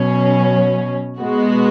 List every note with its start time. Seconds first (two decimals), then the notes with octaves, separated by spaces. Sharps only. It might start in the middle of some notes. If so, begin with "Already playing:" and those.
Already playing: B2 F#3 C#4
1.20 B2 G#3 B3 F#4